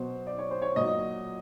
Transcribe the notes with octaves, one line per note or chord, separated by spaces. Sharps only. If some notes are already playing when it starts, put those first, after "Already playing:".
Already playing: B2 F#3 C5
D5
C#5
C5
C#5
A#2 F#3 D#5